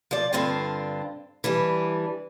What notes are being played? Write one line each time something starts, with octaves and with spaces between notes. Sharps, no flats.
F3 D5
G2 D3 C4 D4 F4
E3 G3 D4